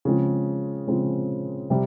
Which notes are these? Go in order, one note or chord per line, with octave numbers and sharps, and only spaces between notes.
C#3 F3 G#3 C4
C#3 F3 G#3 C4
C3 G3